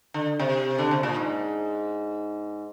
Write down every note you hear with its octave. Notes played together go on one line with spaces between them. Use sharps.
D3
C3
D3
C3
A#2
G#2